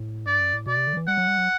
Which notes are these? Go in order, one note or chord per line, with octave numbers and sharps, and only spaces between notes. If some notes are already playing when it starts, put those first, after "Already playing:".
Already playing: A2
G2 D5
F#2
A2
B2 D5
C3
D3
F#3
E3
G3 F#5
F#3
G3
F#3